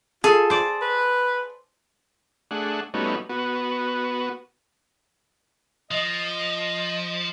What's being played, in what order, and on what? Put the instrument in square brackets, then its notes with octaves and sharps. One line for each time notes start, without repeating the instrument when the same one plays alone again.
[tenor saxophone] F4 [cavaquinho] G#4 [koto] A4
[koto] C5 D5
[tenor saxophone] B4
[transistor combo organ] A3 D4 G#4 F#5
G3 A3 B3 C#4 D#4 F#4
B3 F#4
[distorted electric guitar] F3 [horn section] D#5